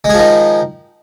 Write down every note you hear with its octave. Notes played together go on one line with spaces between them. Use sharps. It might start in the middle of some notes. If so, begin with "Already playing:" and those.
D#3 F3 G#3 G#4